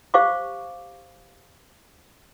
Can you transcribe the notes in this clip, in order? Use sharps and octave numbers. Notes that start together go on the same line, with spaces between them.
G4 C5 F5 C#6 D6